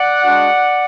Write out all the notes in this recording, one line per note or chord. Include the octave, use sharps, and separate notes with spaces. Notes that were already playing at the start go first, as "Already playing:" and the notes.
Already playing: D5 F#5
G#3 D4 F#4